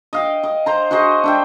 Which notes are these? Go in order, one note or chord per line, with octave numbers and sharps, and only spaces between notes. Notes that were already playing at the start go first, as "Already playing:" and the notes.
D#5 F5 G5
D#5
C5 A#5
F#4 G#4 C5 D#5
D4 E5 G5